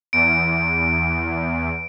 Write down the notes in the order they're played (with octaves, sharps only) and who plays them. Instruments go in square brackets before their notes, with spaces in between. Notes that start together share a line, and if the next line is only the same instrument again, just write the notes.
[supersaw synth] E2 [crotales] D7